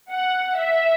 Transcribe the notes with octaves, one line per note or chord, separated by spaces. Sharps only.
F#5
E5